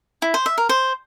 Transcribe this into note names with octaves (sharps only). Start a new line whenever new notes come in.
E4
C5
E5
A#4
C5